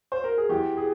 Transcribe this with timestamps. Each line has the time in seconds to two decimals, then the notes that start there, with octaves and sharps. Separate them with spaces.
0.12 C5
0.24 A#4
0.38 G#4
0.49 E2 E3 G4
0.77 G#4